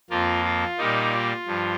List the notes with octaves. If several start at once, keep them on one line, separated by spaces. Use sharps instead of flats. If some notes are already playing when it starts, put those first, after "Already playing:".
F2 F3 A#3 F4
F4
A#2 G3 A#3 D#4
F4
G2 F3